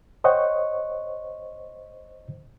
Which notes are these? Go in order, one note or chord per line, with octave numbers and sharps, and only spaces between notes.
C5 C#5 D#5 F#5 G5 C#6